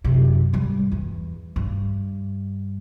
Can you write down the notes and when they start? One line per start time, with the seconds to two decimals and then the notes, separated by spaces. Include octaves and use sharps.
0.04 F#2 C3
0.53 G#1 G3
0.92 E2
1.56 G2